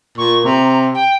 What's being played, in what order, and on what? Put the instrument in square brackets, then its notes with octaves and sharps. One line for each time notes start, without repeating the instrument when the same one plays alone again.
[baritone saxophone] A#2 [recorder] C#6
[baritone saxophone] C3 [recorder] A#5
[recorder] G5